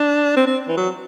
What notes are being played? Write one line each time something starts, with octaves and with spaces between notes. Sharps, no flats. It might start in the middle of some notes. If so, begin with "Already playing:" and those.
Already playing: D4
C4
C4
E3
F#3